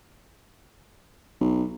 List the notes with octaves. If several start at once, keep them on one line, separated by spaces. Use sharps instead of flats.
B1